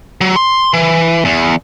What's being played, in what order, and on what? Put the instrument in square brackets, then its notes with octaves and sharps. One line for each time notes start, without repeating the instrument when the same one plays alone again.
[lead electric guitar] F#3
C6
E3
E2